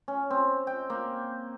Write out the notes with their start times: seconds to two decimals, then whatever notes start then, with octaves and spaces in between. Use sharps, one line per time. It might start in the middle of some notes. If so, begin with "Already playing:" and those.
0.08 C#4
0.30 C4
0.67 G5
0.90 A#3